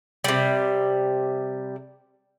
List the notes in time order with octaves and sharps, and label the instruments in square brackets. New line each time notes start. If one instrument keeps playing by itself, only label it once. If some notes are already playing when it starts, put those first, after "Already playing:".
[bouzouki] C3 G3